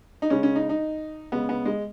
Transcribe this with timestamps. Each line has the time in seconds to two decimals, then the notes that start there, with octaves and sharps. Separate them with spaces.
0.22 D#4
0.30 C#3 G#3 C#4
0.43 C#4
0.56 D#4
0.69 D#4
1.32 C#3 G#3 B3
1.49 B3
1.65 G#3